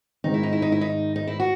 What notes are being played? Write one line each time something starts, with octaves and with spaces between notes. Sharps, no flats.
G#1 G#2 D#3 D#4
E4
D#4
E4
D#4
E4
D#4
D#4
E4
F#4